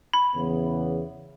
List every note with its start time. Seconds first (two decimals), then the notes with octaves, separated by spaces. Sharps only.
0.14 B5
0.35 E2 C#3 E3 B3